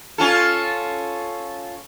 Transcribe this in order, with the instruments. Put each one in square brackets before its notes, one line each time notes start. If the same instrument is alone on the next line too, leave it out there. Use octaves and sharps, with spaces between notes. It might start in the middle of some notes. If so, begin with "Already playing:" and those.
[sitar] C#4 F4 A4